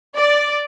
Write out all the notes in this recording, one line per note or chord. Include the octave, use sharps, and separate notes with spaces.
D5